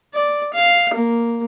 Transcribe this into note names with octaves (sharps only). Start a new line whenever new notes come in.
D5
F5
A#3